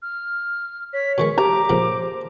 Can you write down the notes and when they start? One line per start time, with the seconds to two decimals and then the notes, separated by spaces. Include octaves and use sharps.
0.02 F6
0.93 C#5 B6
1.18 B2 D#3 G#3 C#6
1.38 G4 A#5 D6
1.69 F2 A#2 C#3 C5